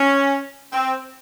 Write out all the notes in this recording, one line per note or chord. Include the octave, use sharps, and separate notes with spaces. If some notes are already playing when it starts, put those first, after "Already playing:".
Already playing: C#4
C4